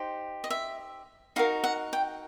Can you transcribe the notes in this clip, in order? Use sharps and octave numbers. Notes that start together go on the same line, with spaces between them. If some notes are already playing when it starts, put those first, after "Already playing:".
Already playing: D#4 G4 C5
D#5
E5
D#4 F#4 A#4 F5
F#5
G5